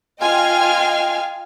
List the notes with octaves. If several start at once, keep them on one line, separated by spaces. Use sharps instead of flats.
F4 D#5 F5 G5 G#5 F6